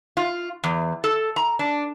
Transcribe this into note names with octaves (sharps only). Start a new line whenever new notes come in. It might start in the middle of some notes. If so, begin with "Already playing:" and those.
F4
E2
A4
A#5
D4